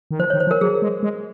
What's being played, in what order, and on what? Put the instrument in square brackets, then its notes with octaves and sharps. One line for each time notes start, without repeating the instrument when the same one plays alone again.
[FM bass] D#3
[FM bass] F3 [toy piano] C5
[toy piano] C#5
[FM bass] D#3
[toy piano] C5
[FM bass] F3
[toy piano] A#4
[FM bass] F#3 [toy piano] G#4
[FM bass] G#3
G#3